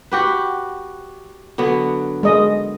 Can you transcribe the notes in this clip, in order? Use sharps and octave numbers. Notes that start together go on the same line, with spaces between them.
F#4 G4 B4
D3 F#3 B3
G#3 D#5